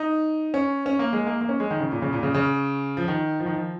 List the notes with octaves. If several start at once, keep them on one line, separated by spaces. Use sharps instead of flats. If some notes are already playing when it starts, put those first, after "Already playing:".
Already playing: D#4
C#4
C#4
A#3
G#3
A#3
A#3
C#4
G#3
D#3
C#3
A#2
C#3
A#2
C#3
C#3
F3
D#3
F3
D#3
F3